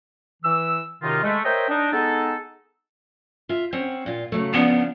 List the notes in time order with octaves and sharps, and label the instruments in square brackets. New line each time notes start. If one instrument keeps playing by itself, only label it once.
[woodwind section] E3 E6
F#2 C3 D#3 D#4 F4
G#3 A3
A#4 C5 C#5 D#5 E5 G5
D4 D#4
G#3 B3 D#4 A4
[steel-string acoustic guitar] F4 E5
C4 C#4 F#5
A#2 F4
C#3 F#3 A3
[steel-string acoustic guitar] C#3 F3 D4 [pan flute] B3